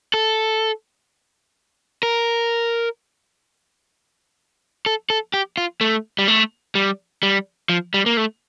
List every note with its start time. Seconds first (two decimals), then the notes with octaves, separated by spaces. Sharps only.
0.14 A4
2.03 A#4
4.86 A4
5.10 A4
5.34 G4
5.57 F4
5.81 A3
6.19 G3
6.28 A3
6.75 G3
7.23 G3
7.69 F3
7.94 G3
8.06 A#3
8.17 A3